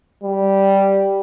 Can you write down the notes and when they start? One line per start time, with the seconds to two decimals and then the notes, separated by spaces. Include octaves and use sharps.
0.24 G3